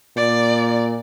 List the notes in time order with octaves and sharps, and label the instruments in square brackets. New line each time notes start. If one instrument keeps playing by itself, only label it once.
[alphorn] A#2 [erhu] D5